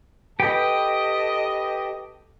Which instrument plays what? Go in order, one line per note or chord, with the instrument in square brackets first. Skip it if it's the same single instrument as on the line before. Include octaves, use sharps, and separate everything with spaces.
[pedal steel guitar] G4 B4 G5 [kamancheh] A4 D#5